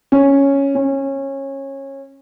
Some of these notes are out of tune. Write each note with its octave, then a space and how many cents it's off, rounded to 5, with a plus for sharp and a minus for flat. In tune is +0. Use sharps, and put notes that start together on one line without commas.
C#4 +0
C#4 -20